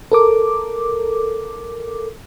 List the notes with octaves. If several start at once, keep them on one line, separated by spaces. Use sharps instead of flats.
A4 A#4 D6